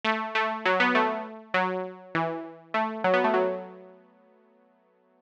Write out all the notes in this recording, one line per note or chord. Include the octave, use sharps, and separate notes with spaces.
A3
A3
F#3
B3
A3
F#3
E3
A3
F#3
B3
A3
F#3